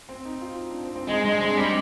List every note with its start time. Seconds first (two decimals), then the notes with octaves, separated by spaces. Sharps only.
0.09 C4
0.25 D#4
0.41 F4
0.59 D#4
0.70 D4
0.83 C4
0.96 C4
1.07 G#3 D#4
1.24 G#3 D4
1.40 G#3 C4
1.50 D4
1.57 G3 C4